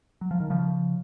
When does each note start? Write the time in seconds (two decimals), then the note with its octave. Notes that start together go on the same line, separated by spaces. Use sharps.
0.21 F#3
0.31 F3
0.40 D#3
0.50 C#3 F3